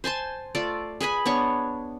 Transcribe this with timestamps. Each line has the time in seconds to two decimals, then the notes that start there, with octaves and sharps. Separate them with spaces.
0.04 C5 G#5 A5 C6
0.55 A3 F4 D5
1.01 G#4 B4 G#5 B5
1.26 B3 D4 C#5 C#6